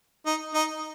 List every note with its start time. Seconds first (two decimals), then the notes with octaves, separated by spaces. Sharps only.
0.26 D#4
0.54 D#4